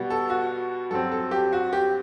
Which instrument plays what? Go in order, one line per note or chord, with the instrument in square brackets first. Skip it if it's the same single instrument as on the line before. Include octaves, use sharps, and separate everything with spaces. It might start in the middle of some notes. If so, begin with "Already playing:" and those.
Already playing: [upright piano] B2 G3 B3
A4
F#4
G2 F#3 C4 A4
A4
G4
F#4
G4